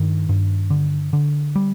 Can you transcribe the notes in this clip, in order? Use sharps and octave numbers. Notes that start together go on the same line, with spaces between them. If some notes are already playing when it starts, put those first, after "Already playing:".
Already playing: G2 D#3
G2
D3
D3
G3